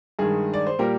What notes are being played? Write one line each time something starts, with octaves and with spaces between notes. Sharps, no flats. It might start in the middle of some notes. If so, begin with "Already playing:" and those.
G2 D#3 G#3 G#4
D5
C5
A#2 G3 A#3 G4 A#4